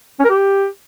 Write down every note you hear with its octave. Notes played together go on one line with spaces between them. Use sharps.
C#4
A#4
G4